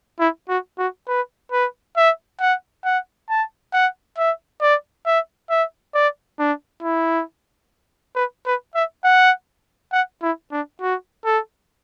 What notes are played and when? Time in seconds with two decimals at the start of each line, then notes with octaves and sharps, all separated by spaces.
0.19 E4
0.49 F#4
0.78 F#4
1.08 B4
1.52 B4
1.97 E5
2.40 F#5
2.85 F#5
3.29 A5
3.73 F#5
4.17 E5
4.61 D5
5.06 E5
5.50 E5
5.94 D5
6.39 D4
6.83 E4
8.15 B4
8.46 B4
8.75 E5
9.04 F#5
9.93 F#5
10.22 E4
10.52 D4
10.81 F#4
11.25 A4